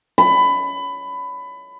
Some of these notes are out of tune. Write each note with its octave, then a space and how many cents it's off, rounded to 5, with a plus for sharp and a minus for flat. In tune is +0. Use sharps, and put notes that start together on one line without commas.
B5 +20